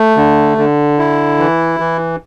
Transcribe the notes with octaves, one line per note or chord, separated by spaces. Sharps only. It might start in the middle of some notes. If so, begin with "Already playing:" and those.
Already playing: A3
D3
D3
E4
E3
E3